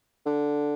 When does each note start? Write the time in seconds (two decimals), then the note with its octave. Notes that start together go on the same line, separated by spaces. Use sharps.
0.26 D3